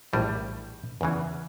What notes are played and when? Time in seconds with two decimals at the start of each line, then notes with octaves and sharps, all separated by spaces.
0.13 A#1 A2 E3 G3
1.01 E2 C#3 E3